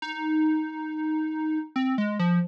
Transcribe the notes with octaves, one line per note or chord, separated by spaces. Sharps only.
D#4
C4
G#3
F3